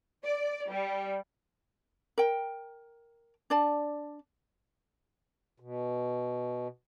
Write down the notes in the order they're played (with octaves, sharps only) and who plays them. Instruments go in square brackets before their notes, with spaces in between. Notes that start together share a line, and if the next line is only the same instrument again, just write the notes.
[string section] D5
G3
[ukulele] A#4 G5
D4 D5 A5
[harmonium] B2